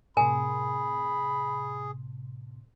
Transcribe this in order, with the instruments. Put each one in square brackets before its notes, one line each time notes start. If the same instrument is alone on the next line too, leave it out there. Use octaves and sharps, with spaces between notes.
[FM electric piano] A2 C3 [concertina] G#4 [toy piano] A#4 G#5 [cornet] B5